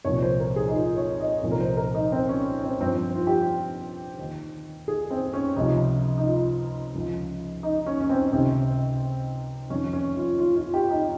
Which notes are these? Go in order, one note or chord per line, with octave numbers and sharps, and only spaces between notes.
C2 A#2 F3 C#5
C5
A#4
G#4
D#4
F4
C#5
D#5
C2 A#2 F3
A#4
C5
A#4
D#4
C4
C#4
C4
G2 F3 C4
F4
G4
D#2 D#3
G#4
C4
C#4
C#2 C3 F3 D#4
D#4
F4
C#2 C#3 F3
D#4
C#4
C#4
C4
C#2 C3 D#3 C4
F2 D#3 C#4
C#4
F4
F4
F4
G4
D#4